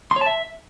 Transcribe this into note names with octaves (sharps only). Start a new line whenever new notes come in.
C6
C#5
A5
E5